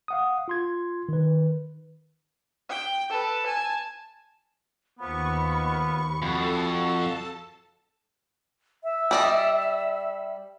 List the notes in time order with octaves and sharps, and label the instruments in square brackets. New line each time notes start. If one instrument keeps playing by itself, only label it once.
[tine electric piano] F5 F#5 D#6
F4 C6 G#6
D#3 B4
[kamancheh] G5
A4 B4
G#5 A5
[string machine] D#2 C#6 [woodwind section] F3 A#3 B3 [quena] B5
[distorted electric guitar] F2 [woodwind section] F#4 [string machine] A4 A5
[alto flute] E5
[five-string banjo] G3 D5 D#5